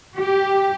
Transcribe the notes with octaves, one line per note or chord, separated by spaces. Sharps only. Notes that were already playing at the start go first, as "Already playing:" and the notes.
G4